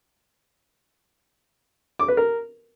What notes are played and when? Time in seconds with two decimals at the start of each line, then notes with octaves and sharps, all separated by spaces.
1.99 D6
2.08 B4
2.17 A#4